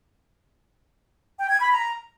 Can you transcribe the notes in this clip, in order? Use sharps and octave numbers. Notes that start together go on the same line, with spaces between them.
G5
G#6
B5
A#5